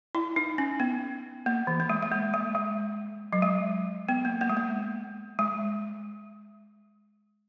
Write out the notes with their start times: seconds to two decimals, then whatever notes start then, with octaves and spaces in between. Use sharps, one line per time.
0.15 E4
0.36 D#4
0.58 C#4
0.80 B3
1.46 A#3
1.67 E3
1.80 A#3
1.90 G#3
2.02 G#3
2.12 A#3
2.34 G#3
2.55 G#3
3.33 F#3
3.42 G#3
4.09 B3
4.25 A#3
4.41 A#3
4.49 G#3
4.57 A#3
5.39 G#3